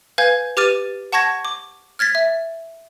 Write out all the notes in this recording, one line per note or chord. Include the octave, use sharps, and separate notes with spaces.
B4 F5 G#5 G6 G#6
G4 B4 D6 F6 A6 D#7
F#5 A5 C#6 G#6 A#6
D6
F6 G#6 A6 B6
E5